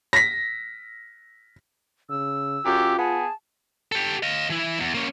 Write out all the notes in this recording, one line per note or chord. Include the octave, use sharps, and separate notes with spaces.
A#6 B6
C#3 E6
F#2 F4 G4
B3 G#4 A5
G4 A4
D#5 F5
E3 E4
E2
A#3 C#4